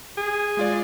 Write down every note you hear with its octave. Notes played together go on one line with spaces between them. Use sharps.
G#4
G#3 F4 D5